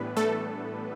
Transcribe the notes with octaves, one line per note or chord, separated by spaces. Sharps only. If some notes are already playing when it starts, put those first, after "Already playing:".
Already playing: A2 E3 G3 B3 D4 B4
A3 A4